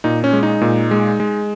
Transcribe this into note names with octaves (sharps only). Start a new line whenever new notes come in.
A#2 D#4
C#4
G#3
D#4
A#2
G#3
G#3